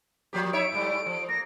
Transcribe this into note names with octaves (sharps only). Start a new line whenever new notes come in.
F3 A#3 G4
D#4 C#5 E5 D7
G#2 G3 A3
F3
A#3 A#6